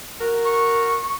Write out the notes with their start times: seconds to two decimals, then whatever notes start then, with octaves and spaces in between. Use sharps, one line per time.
0.21 F#4 A#4
0.45 C#6